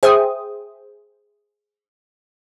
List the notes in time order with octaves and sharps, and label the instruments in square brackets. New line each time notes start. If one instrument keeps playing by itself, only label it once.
[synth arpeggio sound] G#4 C5 E5 G5 D#6